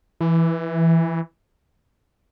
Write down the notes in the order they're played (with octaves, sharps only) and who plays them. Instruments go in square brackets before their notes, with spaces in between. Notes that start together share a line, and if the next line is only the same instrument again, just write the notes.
[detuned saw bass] E3